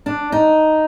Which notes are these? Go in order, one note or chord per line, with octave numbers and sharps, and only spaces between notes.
D4
D#4